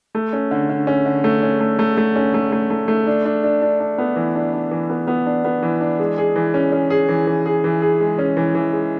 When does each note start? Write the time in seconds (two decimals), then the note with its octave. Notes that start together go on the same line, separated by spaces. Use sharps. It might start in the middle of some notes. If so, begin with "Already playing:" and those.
0.15 A3
0.33 C#4
0.51 D3
0.69 D3
0.87 C#4
1.06 D3
1.24 A3
1.43 C#4
1.60 A3
1.79 A3
1.97 A3
2.16 C#4
2.34 A3
2.52 A3
2.70 A3
2.88 A3
3.07 D4
3.25 D4
3.44 D4
3.62 D4
3.80 D4
3.98 B3
4.16 E3
4.35 D4
4.53 D4
4.71 E3
4.90 B3
5.07 B3
5.26 D4
5.44 B3
5.63 E3
5.81 D4
6.00 G#3
6.18 G#4
6.36 E3
6.54 C#4
6.72 C#4
6.90 G#4
7.09 E3
7.27 E3
7.46 G#4
7.64 E3
7.82 G#4
8.00 G#3
8.19 C#4
8.37 E3
8.55 E3
8.73 G#3